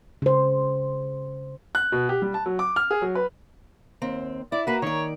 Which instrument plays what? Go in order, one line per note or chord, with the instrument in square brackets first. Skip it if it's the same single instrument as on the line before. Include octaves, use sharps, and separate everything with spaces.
[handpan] C#3 C5
[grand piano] F#6
B2
G4
G3
A5
F#3
D6
F6
G#4
F#3
B4
[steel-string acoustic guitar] D#2 C4
[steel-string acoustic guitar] E4 [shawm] D5
[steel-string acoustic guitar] A#3 F#4 [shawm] B4
[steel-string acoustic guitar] D#3 D5 [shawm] C#5